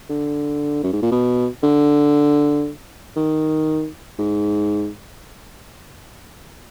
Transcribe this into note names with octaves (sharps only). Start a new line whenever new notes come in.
D3
F#2
G#2
A#2
B2
D3
D#3
G#2